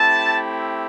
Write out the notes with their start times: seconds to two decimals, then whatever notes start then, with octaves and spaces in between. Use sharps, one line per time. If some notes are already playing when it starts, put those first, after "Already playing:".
Already playing: A3 C4 E4 G4 A5